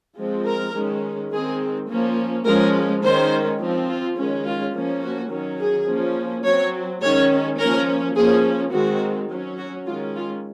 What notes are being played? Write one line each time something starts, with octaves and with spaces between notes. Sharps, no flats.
F3 G#3 C4
A#4
D#3 G#3 C#4
D#3 G#3 C4 G#4
F3 A#3 C#4
F3 G#3 C#4 A#4
D#3 G#3 C#4 C5
F3 C4
F4
D#3 G#3 C#4
F4
F3 A#3 C#4
F#4
D#3 F#3 C#4
G#4
F3 A#3 C#4
F#3 C4 C#5
D#3 G#3 C#4 C#5
F3 A#3 C#4 A#4
F3 A#3 C#4 G#4
D#3 G#3 C4 F#4
F#3 C#4
F#4
D#3 G#3 C#4 F4
F4